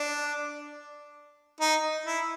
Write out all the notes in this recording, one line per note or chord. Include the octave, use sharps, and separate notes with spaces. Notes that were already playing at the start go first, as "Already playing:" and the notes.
Already playing: D4
D#4
E4